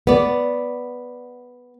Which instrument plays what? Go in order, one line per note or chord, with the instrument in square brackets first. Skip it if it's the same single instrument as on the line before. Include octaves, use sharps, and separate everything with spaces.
[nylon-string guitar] B3 D5